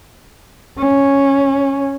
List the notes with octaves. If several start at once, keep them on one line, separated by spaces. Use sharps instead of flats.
C#4